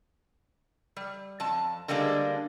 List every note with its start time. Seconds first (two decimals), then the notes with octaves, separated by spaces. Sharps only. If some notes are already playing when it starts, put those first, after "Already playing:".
0.97 G3
1.40 F2 A5
1.88 D3 G3 G#3 A#3 D4